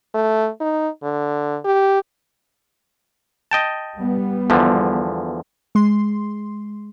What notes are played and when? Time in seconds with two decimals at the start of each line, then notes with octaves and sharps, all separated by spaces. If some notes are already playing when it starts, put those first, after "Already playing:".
0.14 A3
0.61 D#4
1.03 D3
1.65 G4
3.51 D#5 G5 A5
3.98 G3 B3
4.50 E2 D3 F3
5.75 G#3 C6